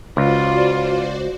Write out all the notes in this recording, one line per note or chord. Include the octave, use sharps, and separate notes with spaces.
C#2 F4 F#4 C5 D5